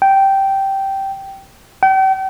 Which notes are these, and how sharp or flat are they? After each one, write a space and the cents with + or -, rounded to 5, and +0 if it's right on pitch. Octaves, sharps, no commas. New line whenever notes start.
G5 -10
G5 -40